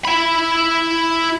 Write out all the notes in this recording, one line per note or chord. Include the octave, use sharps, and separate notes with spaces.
E4 B5